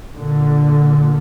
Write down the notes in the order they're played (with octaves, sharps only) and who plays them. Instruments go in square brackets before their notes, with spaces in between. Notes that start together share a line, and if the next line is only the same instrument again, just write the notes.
[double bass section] A#2 D3